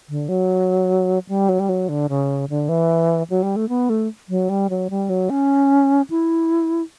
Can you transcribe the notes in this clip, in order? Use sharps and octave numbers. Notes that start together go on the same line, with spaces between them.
D3
F#3
G3
F#3
G3
F#3
D3
C#3
D3
E3
F#3
G3
A3
B3
A3
F#3
G3
F#3
G3
F#3
C#4
E4